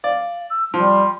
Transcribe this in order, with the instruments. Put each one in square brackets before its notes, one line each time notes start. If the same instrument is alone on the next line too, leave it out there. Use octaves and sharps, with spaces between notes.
[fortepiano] D5 [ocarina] F5
[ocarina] E6
[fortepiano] F3 [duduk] G3 [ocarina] C6